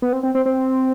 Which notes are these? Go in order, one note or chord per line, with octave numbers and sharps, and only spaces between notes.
B3
C4
C4
C4
C4